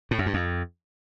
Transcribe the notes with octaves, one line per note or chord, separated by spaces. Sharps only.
A2
F#2
G2
F2